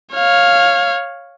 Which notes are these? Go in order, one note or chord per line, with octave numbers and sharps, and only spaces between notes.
C#5 F5